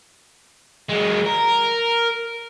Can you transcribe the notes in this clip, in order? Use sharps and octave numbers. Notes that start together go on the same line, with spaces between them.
F#3 G#3
A#4